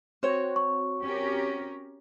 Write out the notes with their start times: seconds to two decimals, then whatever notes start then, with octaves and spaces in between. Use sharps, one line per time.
0.23 C4 F#4 C5 C#5
0.56 C#6
1.04 C#4 G4 A#4